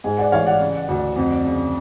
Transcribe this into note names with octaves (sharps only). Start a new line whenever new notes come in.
G#2 G#4
D5 F#5
A1 C#5 F5
D5 F#5
C#3
D2
F2
C#3